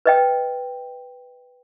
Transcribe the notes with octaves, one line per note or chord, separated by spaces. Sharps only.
B4 D#5 G5